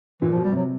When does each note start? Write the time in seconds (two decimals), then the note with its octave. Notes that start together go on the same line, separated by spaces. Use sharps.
0.22 A#2 E3
0.32 F3
0.37 B2
0.44 G3
0.52 C3 F#3